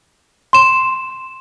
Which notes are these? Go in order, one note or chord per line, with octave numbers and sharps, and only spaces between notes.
C6 E7